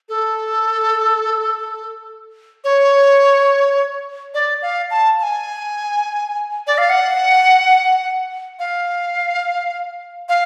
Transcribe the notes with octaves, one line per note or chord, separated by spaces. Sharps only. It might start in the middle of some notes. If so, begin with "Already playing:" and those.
A4
C#5
D5
F5
A5
A5
G#5
D5
F5
F#5
F5
F5